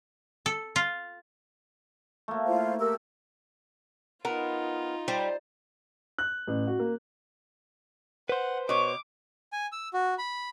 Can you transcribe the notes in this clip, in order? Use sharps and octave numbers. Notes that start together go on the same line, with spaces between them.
A4
F4
A3 A#3
E4 F4 C5
G4 A#4 E6
B3 D#4 F4 A#4
G3 C5
F#6
A1
F#4
A#3
B4 C5 F#5
B2 C#5 D6
G#5
E6
F#4
B5